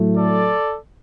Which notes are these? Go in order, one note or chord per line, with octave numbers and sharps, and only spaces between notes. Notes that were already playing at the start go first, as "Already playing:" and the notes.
Already playing: A2 F#3 A3
A4 D5